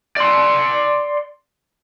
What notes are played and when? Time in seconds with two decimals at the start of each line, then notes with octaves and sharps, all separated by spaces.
0.17 D5 C6